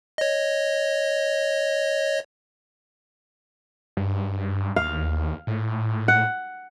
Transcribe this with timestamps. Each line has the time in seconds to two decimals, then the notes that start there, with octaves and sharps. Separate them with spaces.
0.18 C#5 D#5
3.97 G2
4.76 D#2 F5
5.47 A2
6.08 F#5